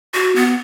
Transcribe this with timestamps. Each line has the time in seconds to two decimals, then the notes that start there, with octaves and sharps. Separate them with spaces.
0.14 F#4
0.35 B3